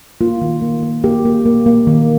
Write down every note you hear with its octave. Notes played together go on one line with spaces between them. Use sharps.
A#3 F4
D#3
A#3
A#3
A#3 G4
A#3
A#3
A#3
D#3